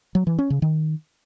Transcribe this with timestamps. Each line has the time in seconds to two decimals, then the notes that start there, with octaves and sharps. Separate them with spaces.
0.15 F#3
0.27 E3
0.39 C#4
0.50 C#3
0.62 D#3